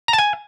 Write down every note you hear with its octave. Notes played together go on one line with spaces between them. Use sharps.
A#5
A5
G#5